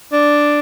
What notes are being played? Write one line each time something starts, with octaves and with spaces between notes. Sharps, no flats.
D4